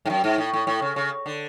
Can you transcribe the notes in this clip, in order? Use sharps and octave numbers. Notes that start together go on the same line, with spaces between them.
G#2
F#2
G#2
A2
A2
A2
C#3
C#3
D3